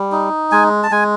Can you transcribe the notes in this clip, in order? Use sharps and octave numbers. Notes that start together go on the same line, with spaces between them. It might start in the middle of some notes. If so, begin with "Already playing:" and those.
Already playing: G3
D#4
G#3 G#5
A5
G#3 G#5